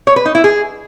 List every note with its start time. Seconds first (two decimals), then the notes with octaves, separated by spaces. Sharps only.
0.07 C#5
0.16 B4
0.25 D#4
0.35 E4
0.44 G#4